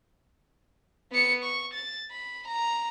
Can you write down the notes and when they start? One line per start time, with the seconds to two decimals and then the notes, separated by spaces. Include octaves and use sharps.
1.12 B3 C#7
1.44 C#6
1.74 A6
2.11 B5
2.48 A#5